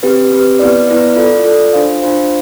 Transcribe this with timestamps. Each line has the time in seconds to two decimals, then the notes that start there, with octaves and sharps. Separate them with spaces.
0.03 C4 G4 B4
0.32 C4 G4 B4
0.59 B3 E4 B4 D5
0.88 B3 E4 B4 D5
1.16 F4 A4 D5
1.44 F4 A4 D5
1.73 D4 F4 C5 F5
2.01 D4 F4 C5 F5